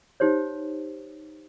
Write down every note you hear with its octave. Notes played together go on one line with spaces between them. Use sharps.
D#4 G4 C5 C#5